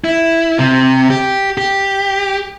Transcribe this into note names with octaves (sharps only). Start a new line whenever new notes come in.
E4
C3
G4
G4